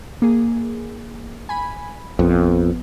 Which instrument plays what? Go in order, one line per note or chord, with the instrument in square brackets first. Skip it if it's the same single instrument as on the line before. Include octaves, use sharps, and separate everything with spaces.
[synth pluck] A#3 G#4
G#5 B5
[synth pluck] A1 F3 B3 [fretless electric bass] F2